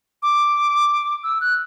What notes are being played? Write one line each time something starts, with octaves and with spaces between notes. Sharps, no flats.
D6
E6
F#6